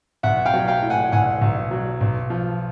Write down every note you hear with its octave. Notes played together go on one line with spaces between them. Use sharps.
B1 E5 F#5
F5 G5
F#3
F5 G5
A2
F#5 G#5
B1 F#5 G#5
B1
F#3
B1
F3